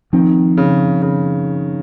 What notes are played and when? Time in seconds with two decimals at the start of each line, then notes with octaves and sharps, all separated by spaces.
0.13 D#3 F3 C4
0.57 C#3
1.02 C#3